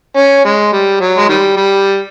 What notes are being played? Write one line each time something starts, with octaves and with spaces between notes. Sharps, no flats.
C#4
G#3
G3
F#3
G#3
D#3 G3
G3